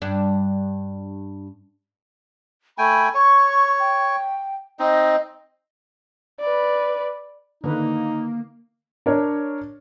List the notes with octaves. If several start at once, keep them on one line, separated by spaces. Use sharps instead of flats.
G2 D4
A3 G5 G#5 B5
C#5 C#6
G5
C4 D#4 D#5
B4 D5
D3 D#3 A#3 D#4 B4
D4 A#4 C#5